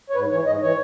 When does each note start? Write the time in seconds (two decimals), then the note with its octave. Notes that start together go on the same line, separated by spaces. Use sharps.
0.10 C#5
0.15 G#2 B4
0.31 E3 C#5
0.46 G#2 D#5
0.62 E3 C#5